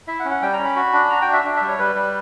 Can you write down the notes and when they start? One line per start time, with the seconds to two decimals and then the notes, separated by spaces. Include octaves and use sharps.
0.07 E4 E5
0.20 F#5
0.25 C#4
0.31 F#5
0.42 G3 G5
0.53 A#5
0.59 C#4
0.65 B5
0.76 F#4
0.93 D4
1.10 F#4 A#5
1.22 G5
1.28 D4
1.33 E5
1.45 D4
1.56 G3 E5
1.68 C#5
1.79 G3 B4
1.95 G3